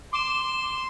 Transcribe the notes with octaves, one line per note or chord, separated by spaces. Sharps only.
C6 D6 E7